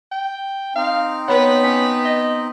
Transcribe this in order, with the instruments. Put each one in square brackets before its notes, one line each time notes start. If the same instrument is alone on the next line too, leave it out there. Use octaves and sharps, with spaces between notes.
[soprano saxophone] G5
[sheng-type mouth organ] C4 D#4 [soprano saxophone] F5
[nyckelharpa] B3 B4 [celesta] C#5 B5 [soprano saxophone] F#5
[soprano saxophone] C#4 [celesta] B6
[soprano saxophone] D#5